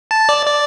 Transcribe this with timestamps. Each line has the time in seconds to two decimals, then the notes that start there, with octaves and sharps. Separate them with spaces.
0.11 A5
0.29 D5
0.46 D5